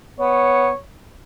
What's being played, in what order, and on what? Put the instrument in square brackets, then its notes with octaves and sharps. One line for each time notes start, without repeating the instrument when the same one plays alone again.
[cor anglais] B3 [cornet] C#5